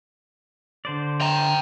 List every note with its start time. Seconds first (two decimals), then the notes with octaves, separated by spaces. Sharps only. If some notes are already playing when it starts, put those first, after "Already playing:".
0.85 D3 C5 D5
1.21 G5 A#5